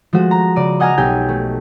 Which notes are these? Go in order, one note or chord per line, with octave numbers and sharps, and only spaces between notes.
F3 G#3 A3 F#4
A#5
C#3 D5 D#7
D#5 F#5 G#5 A#5 F6
B1 G4 G#5 G6
A3